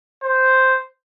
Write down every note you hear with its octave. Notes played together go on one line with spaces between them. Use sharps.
C5